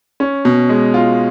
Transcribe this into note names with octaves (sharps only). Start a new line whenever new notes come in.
C#4
B2
G#3
F4